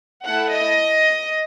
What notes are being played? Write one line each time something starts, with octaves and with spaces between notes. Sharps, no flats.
A3 E4 A4 F#5
D#5